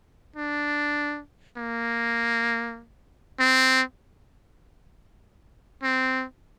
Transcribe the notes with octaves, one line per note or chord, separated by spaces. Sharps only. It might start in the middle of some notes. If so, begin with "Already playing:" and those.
D4
A#3
C4
C4